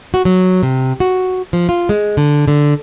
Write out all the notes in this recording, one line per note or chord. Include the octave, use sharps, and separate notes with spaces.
F#4
F#3
C3
F#4
F3
F4
G#3
D3
D3